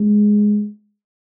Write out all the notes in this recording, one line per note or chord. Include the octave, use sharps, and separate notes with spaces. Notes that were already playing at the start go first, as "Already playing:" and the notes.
Already playing: G#3